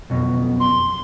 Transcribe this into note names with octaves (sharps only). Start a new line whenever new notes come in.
B1 F2 B2
C6